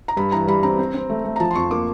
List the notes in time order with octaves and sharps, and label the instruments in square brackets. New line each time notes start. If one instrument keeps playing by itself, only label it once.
[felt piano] A#5
G2 B5
E3 A#5
G3 B5
C4 A#5
C4
C4
A3
A3
A#5
F3 A5
C6
F2 C#6
A#3 D6